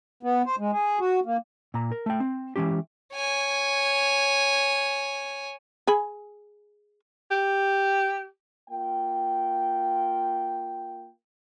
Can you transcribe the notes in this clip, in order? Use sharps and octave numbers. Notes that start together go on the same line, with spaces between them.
B3
C5
G#3
G#4
F#4
A#3
A#2 A#5
A#4
A3 G5
C4
E3 G#3 C#4 G4
C#5 G#5
G#4 G#5 B5
G4
A#3 F4 G5